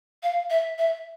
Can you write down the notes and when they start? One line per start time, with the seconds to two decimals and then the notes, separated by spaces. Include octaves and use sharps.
0.23 F5
0.50 E5
0.78 E5